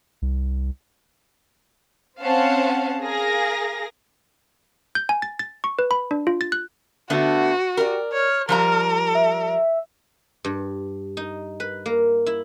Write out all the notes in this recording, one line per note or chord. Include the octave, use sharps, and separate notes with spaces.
C2
C4 C#4 C5 F5 F#5 A5
G#4 A#4 F5 A#6
G6
G#5
A6
A6
C#6
B4
B5
D4
F4
A6
F#6
D3 A3 B3 F#4
G4 A#4 D5
C#5 F6
F3 G3 A#4 A#5
E5
G2
D#4
B4
A#3
E4